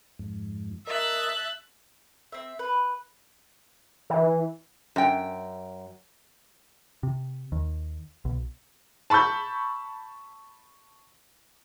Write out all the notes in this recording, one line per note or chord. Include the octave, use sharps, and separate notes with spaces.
F2 G#2
A#4 D#5 E5 A5 F#6
C4 E5
B4
E3
F#2 G5
C3
D#2
B1
A5 B5 C#6 E6 G6